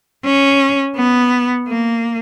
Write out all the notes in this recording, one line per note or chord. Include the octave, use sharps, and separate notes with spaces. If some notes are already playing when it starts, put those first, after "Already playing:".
C#4
B3
A#3